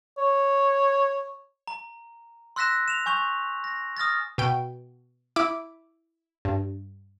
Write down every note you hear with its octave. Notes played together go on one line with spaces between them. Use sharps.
C#5
A#5
C6 E6 F#6 A#6 B6 E7
E7 F7
G#5 C#6 G6 F7
A#6
D#6 F6 A6 A#6
B2 G5
E4 E5 D6
G2